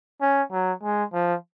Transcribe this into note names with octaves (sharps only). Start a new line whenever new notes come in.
C#4
F#3
G#3
F3